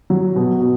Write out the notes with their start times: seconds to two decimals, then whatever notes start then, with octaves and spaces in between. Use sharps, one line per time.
0.10 F#3
0.36 B2
0.61 B2